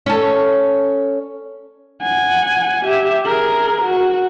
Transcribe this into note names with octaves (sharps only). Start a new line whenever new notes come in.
C#4 A4
F#5 G#5
G4 E5
G#4 A#4
F#4